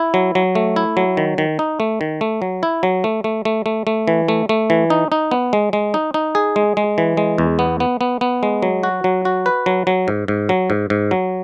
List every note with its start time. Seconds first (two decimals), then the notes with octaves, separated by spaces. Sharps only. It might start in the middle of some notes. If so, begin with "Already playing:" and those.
Already playing: E4
0.14 F#3
0.35 F#3
0.55 A3
0.76 E4
0.97 F#3
1.17 D#3
1.38 D#3
1.59 D#4
1.80 A3
2.01 D#3
2.21 A3
2.42 F#3
2.63 E4
2.83 F#3
3.04 A3
3.24 A3
3.45 A3
3.66 A3
3.87 A3
4.08 E3
4.28 A3
4.49 A3
4.70 E3
4.90 D#4
5.12 D#4
5.31 B3
5.53 G#3
5.73 G#3
5.94 D#4
6.14 D#4
6.35 G#4
6.56 G#3
6.77 G#3
6.98 E3
7.17 G#3
7.38 E2
7.59 B3
7.80 B3
8.01 B3
8.21 B3
8.43 G#3
8.62 F#3
8.83 F#4
9.04 F#3
9.25 F#4
9.46 B4
9.66 F#3
9.87 F#3
10.08 G#2
10.28 G#2
10.49 F#3
10.70 G#2
10.90 G#2
11.11 F#3